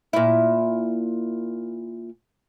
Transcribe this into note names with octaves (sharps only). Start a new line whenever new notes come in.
A#2 E4